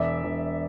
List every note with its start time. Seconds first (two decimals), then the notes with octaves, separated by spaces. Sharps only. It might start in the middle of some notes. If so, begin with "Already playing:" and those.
Already playing: E1 D5 E5
0.23 E1